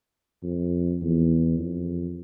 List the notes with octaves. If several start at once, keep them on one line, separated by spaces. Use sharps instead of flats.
F2
E2
F2